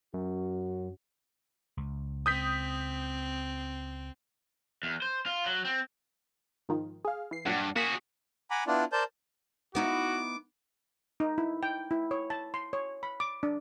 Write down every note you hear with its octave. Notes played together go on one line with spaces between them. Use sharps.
F#2 C#4 F#4
C#2
C4 D#6 G6 B6
E2
C5
F4
F#3
C4
G#2 D#3 F3
G#4 F5
E3 C7
G2 A#2 F#3 F#5
A#3 F#4 G#4 B6
F#5 G#5 A#5 B5 D6
B3 D4 E4 F4 D5
A#4 C5 D5 A5 G6
B3 D#4 E4 F#4 D6
D#4
E4
G5
E4
C#5
A5
C6
C#5
B5
D6
D4